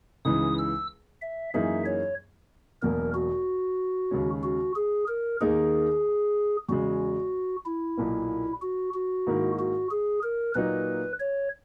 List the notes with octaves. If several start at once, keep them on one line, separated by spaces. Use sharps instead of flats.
C#2 C#3 E3 G#3 D#4 D#6
E6
E5
F#2 E3 A#3 D#4 G#4 E5
C#5
E1 E2 B2 F#3 A#3 A#4
F#4
D#2 C#3 G#3 C#4
F#4
G#4
A#4
D#2 D#3 A#3 D#4 G#4 A#4
E2 C#3 G#3 F#4
E4
B1 A#2 A#3
F#4
F#4
G#2 D#3 A#3 E4 A#4
F#4
G#4
A#4
A#2 F#3 A#3 D#4 B4
C#5